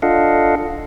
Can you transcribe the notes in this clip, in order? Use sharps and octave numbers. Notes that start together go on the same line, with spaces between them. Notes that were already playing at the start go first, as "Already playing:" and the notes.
D4 F4 A4 D#5 F5 F#5